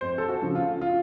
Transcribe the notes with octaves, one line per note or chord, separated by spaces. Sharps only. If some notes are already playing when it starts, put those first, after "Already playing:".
F2 C5
A4
F#4
C#3 F3
F4
F4